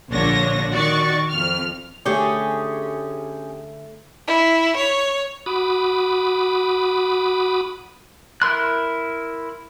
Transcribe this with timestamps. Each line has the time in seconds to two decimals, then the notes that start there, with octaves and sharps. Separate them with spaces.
0.11 A#1 A#2 D3 D4 C#5 A#6
0.71 D#3 F#4 D5 C#6 A6
1.30 F2 F6
2.06 D3 A3 C#4 G4 G#4
4.28 E4
4.77 C#5
5.46 F#4 B5 D6 D#6
8.42 E4 A#4 C6 F#6